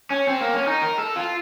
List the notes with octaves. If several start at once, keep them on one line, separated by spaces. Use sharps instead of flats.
C#4
C4
A#3
C#4
D#4
A#4
A4
F4